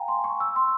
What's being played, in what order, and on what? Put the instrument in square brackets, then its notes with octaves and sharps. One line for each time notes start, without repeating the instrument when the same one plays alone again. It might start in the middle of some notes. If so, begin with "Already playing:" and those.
Already playing: [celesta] F5 G5 G#5 A#5
C6
C#6
E6
C6